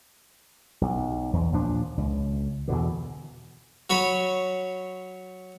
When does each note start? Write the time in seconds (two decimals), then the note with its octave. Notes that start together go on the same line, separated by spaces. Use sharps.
0.81 B1
1.33 E2
1.52 D#2 A#2 F3 D4
1.97 C#2
2.68 E2 B2 D3
3.90 F#3 C#5 B5